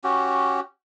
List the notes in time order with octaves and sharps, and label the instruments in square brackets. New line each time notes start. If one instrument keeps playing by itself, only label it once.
[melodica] C#4 F#4 G4